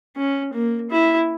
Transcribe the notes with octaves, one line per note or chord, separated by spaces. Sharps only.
C#4
A#3
E4